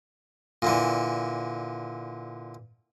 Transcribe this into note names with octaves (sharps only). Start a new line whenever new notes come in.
A#2 D3 E3